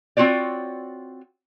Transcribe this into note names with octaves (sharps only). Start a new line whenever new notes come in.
C4 F4 F#4 C#5 D5